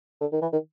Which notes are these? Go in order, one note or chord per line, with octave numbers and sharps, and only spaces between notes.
D3
D#3
E3
D#3